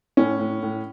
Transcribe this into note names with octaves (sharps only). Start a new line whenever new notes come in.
A2 C#4
A2
A2